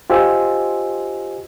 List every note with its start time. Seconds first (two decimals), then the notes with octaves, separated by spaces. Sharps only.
0.10 F4 G4 C5 D#5 G#5 E6